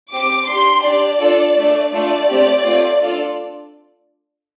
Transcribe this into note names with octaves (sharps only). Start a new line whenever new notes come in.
C4 G4 D6
D4 G4 C6
D4 G4 D5
D4 F4 A4
A3 D4 A4
A3 D4 F4 A4 D5
A3 C4 G4
A3 C4 F4
D4 F4 A4